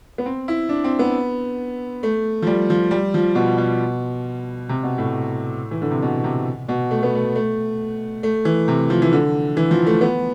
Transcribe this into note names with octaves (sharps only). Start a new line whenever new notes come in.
B3
C4
E4
D4
C4
B3
A3
F3
G3
F3
G3
F3
B2
B2
C3
B2
A2
E3
D3
C3
B2
C3
B2
A3
B3
A3
A3
A3
E3
C3
F3
E3
D3
E3
F3
A3
B3